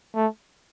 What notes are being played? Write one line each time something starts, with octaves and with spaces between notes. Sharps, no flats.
A3